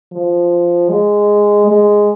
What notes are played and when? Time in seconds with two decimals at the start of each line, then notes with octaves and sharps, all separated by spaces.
0.12 F3
0.89 G#3
1.67 G#3